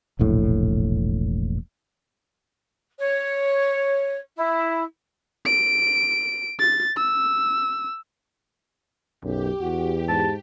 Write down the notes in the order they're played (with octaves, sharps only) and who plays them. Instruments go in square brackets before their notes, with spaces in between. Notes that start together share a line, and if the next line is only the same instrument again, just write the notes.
[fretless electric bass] E1 A#1 A2
[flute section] C#5
E4
[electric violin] D7
A6
E6
[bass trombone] B1 [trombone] F#2 [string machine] G4
[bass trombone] E2 [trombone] F#4
[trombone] G#2 [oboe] A5